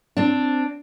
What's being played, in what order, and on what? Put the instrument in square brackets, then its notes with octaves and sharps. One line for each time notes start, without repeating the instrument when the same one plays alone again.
[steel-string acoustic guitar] C4 D4